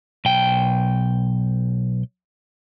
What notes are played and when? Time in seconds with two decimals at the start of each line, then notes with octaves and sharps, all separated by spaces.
0.25 B1 G5